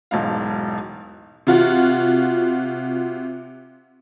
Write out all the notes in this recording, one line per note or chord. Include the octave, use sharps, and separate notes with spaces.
E1 B1 G#2 F5
C3 F4 F#4